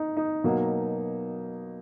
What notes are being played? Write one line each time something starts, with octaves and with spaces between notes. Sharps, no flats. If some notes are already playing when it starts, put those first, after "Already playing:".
Already playing: D#4
D#4
B2 F#3 A#3